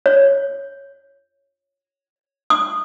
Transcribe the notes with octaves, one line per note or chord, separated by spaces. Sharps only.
C#5
D#6